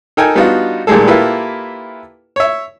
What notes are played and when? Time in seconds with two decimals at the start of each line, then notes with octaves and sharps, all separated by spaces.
0.17 D#4 A4 A#4 G5 G#5
0.35 G3 B3 D4 D#4 F4 F#4
0.87 A#2 D#3 G3 G#3 G#4 A4
1.08 A#3 E4 F4 G4 A4 B4
2.36 C#5 E5